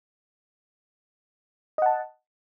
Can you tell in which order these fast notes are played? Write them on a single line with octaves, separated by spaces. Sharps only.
D#5 F#5 A5